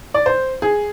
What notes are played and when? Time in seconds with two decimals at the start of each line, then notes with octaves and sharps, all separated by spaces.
0.14 D5
0.26 C5
0.62 G#4